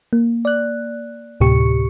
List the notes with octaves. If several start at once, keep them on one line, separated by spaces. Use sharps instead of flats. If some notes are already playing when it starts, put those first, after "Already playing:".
A#3
D5 F#6
D2 A2 C3 G4 C#6 C#7